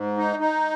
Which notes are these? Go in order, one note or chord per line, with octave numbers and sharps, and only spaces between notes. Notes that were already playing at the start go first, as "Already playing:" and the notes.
Already playing: G#2
D#4
D#4